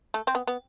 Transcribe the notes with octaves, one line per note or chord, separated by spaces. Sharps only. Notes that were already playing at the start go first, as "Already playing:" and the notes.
A3
C4
B3
B3